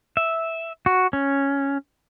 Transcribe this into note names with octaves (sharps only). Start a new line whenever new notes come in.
E5
F#4
C#4